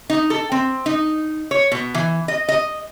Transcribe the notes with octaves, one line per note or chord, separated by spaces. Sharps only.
D#4
A4
C4
D#4
C#5
B2
E3
D#5
D#5